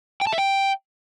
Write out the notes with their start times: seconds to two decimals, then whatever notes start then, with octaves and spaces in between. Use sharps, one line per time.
0.21 G5
0.27 A5
0.32 E5
0.38 G5